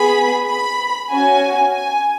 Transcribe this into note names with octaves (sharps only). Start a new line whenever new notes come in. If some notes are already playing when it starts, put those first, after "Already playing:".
Already playing: B3 G#4 B5
B5
C#4 F#4 G#5
G#5